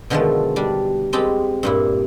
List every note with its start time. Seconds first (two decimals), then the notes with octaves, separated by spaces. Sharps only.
0.10 B2 D3 D#3 F3 G#3 A3
0.56 G3 D4
1.13 G#3 C4 G4 D#5 A5 B5
1.63 G2 A#2 E4